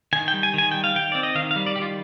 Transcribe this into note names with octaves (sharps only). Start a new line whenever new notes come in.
D#3 G#5
G5
G3
G#5
D#3 G#5
G3 G5
F5
D#3 G5
C4 D5
D#5
D#3 F5
F5
G3
D5
D#3 G4
F4